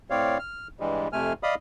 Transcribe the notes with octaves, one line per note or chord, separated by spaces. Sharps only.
A2 C4 C#5 D5 F5
F6
G2 E3 G3 G#3
F2 C3 A3 G#5 F6
D5 D#5 F5 B5 D#6